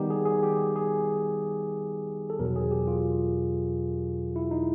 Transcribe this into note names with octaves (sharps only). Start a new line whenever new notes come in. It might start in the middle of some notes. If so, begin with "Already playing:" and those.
Already playing: D#3 G3 B3 D#4 G4
G#4
G#4
G4
G#4
A4
E2 B2 F#3 A#4
G#4
G4
F4
E4
D#4